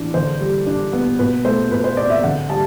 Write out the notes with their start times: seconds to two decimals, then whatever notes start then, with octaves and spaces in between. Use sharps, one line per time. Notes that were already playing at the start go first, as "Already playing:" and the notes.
Already playing: E3 D4
0.14 D3 C5
0.41 G3
0.66 D4
0.93 B3
1.19 B2 B4
1.45 A3 C5
1.71 B2 B4
1.84 C5
1.97 C4 D5
2.10 E5
2.23 D3 F#5
2.49 G3 A5